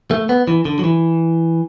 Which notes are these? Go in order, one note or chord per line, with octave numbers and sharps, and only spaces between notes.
A3
B3
E3
D3
F#3
E3